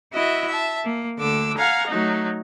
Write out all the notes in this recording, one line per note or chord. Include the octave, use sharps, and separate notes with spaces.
E4 F#4 D#5 E5
E5 A5
A#3
D2 D3 D6 E6
F5 F#5 G#5 A#5
F#3 A3 D#4